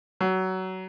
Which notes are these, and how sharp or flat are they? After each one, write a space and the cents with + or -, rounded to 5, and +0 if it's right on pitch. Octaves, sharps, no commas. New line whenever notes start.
F#3 +20